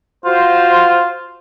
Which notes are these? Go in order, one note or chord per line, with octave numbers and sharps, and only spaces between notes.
F4 F#4 C5